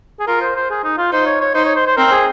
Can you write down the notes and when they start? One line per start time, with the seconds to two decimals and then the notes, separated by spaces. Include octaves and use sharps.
0.20 G#4
0.27 F4 A#4
0.41 C5
0.56 C5
0.70 G#4
0.84 D#4
0.98 F4
1.12 D#4 C5
1.26 C#5
1.41 C#5
1.55 D#4 C5
1.65 C#5
1.76 C5
1.87 C5
1.97 C4 A#4
2.12 G#4